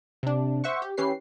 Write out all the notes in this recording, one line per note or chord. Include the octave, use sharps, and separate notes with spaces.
C3 D4
C5 E5 F#5 C#6
G4
E3 C#4 G4 B4 C7